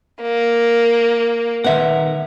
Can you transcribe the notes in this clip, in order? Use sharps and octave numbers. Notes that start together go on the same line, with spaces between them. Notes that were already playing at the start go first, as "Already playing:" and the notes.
A#3
D#3 B3 A#4 E5 F#5